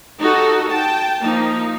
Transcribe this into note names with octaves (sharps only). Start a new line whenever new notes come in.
D#4 F#4 G4 A4
G5 A5
F3 A#3 D#4